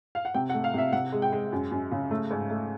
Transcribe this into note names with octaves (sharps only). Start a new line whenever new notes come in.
F5
F#5
C3 G5
F#5
A3
F5
C3 E5
C3 F#5
G#3
G5
G#3
F#2
F#2
C#3
A3
G#2
A3